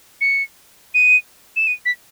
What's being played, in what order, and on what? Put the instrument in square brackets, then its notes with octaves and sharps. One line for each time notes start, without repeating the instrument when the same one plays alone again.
[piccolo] C#7
D#7
E7
D#7
B6